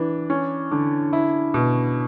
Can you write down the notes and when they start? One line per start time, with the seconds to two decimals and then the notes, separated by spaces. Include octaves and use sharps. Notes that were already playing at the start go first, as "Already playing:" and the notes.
Already playing: E3 D4
0.30 C#4
0.71 D3
1.13 E4
1.54 B2